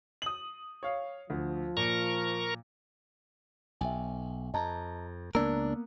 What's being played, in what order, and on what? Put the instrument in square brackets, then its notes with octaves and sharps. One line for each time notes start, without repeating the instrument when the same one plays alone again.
[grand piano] D#6 F#7
C#5 F5
[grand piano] D2 [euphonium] F3
[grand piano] A#2 [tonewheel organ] A#4 A#5 C#6
[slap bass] B1 [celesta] E5 G5 G#5
[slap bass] F2 [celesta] D#5 A5 A#5
[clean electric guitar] C#2 D4 A#4 [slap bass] A#3 B3 [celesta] E6